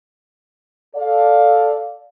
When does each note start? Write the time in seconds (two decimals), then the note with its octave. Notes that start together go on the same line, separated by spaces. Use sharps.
0.95 A4 D5 F5